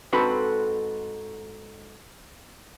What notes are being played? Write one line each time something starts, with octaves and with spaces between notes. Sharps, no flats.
G#2 C4 F#4 A4 B4